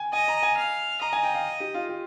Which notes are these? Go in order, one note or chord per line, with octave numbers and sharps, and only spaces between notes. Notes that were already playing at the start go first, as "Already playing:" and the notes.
Already playing: G5 G#5
D#5 G#5
A#5
G#5
F5
D#5 A#5
G#5
G5
F5
G4
F4
G4